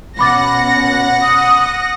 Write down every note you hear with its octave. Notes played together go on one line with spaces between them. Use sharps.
B2 C#4 F#5 B5 D6 A6 A#6
D#6